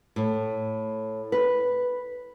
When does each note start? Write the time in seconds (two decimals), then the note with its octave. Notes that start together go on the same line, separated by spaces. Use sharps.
0.16 A2
1.32 B4